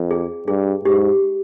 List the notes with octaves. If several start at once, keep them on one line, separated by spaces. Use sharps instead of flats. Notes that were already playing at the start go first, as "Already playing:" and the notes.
Already playing: F2
G#4
G2 G#4
G#2 G4